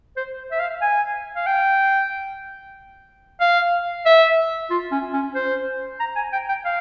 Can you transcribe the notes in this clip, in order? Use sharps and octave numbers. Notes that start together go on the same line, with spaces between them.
C5
E5
F5
G#5
F5
G5
F5
E5
F4
C#4
C#4
C5
A#5
G#5
G5
G5
F5